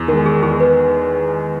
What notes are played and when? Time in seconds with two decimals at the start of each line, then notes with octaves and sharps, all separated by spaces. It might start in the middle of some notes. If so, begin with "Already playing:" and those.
Already playing: E2
0.08 D#3 G#3 A#4
0.26 G#4
0.42 E2 G#4
0.60 B4